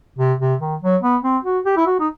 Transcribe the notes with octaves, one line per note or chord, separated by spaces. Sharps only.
C3
C3
D#3
F#3
B3
C4
F#4
G4
E4
F#4
D#4